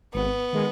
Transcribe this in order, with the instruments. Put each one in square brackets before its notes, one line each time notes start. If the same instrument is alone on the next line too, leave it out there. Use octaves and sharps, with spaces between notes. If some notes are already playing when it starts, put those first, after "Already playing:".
[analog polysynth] G#1 [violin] B3
[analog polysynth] D#3 G#3